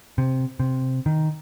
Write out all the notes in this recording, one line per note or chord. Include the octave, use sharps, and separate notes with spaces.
C3
C3
D#3